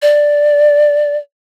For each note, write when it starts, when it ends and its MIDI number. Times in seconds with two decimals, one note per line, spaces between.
0.02 1.17 74